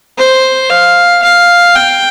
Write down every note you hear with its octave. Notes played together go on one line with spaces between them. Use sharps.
C5
F5
F5
G5